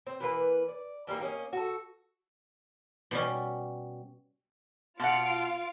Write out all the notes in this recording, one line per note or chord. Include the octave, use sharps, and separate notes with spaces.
C4
E3 A#3 B4
D5
E3 G3 A#3 D#4
A#3 C#4 D#5
F#4 A4
B2 G3 C#4
B2 F4 F5 F#5 D7